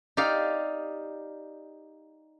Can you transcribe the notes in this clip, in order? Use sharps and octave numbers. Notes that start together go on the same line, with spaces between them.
D#4 G4 D5 F5